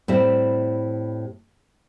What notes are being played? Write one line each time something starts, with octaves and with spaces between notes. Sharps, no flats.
A2 G3 C4 E4